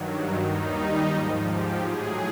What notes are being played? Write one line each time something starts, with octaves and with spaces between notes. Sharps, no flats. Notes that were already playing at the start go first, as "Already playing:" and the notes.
Already playing: G2 D#3 F#3
D#2 D#3 G3 D#4
G#2 F3
G4
A2 F#3 G#4